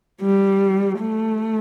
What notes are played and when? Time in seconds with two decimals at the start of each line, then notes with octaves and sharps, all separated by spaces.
0.22 G3
0.99 A3